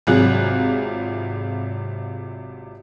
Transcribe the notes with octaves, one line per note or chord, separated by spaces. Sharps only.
G#1 C3 F#3 F4 G#4 F#6